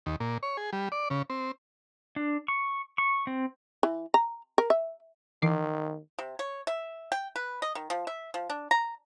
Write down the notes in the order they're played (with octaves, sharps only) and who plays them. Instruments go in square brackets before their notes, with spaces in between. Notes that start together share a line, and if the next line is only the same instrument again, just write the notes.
[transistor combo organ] D#2
A#2
C#5
G#4
G3
D5
C#3
C4
[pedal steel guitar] D4
C#6
C#6
C4
[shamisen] E3
A#5
A#4
E5
[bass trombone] D#3 [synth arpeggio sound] E3 D6 C7
[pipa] C3
C#5
E5
G5
B4
D#5
D#3
F3
E5
F3
D4
A#5